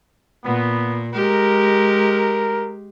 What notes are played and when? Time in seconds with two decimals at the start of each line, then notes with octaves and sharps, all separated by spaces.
0.45 A#2 B3
1.13 G#3 G4 A#4